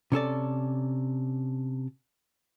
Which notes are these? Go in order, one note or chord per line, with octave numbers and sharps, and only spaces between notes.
C3 C#4 A4 D5